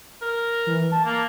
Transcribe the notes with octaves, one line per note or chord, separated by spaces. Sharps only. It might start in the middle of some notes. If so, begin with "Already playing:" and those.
A#4
E3
A5
A#3